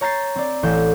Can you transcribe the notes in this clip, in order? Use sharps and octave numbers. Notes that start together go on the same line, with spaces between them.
C#5 A#5 G6 A6 C7
C4 D5
A1 G6 E7